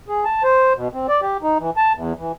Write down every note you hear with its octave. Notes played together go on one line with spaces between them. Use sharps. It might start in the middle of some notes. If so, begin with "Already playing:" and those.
G#4
A5
C5
B2
C4
D5
G4
D#4
E3
A5
E2
E3